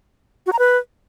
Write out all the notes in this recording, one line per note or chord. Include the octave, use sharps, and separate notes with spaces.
F#4
A#5
B4